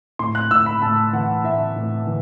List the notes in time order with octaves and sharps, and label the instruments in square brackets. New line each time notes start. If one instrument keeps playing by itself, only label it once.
[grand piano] A2 C6
F#6
A2 E6
B5
A2 A5
E3 F#5
A2 E5
A2
E3